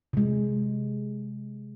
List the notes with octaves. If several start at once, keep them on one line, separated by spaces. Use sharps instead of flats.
C3 G#3